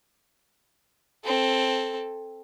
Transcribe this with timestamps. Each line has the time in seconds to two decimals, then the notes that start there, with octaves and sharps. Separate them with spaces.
1.24 C4 A4